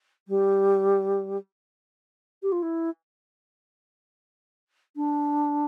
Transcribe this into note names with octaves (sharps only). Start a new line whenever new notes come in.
G3
G4
F4
E4
D4